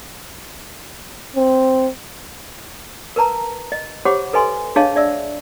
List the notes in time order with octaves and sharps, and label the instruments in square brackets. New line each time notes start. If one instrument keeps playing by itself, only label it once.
[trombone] C4
[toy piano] A#4 B4 A5 A#5
D#5
G4 C5 C#5 F#5 B5 D6
A4 B4 D#5 G#5 C6
D4 G#4 C#5 D#5 F5 A5
D5 E5 E6